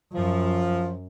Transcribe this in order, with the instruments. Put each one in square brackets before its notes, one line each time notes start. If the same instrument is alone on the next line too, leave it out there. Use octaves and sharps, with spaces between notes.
[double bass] F#2 [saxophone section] F3